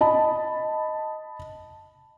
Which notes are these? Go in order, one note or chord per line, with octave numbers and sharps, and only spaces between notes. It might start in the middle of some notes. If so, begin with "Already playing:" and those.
D#5 A5 B5